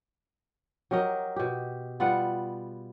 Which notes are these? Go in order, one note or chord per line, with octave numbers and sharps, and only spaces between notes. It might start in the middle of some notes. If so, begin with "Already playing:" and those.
F#3 G4 A#4 D#5
B2 G4
G3 B3 F4 F#5